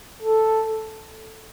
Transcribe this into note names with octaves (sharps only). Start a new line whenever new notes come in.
A4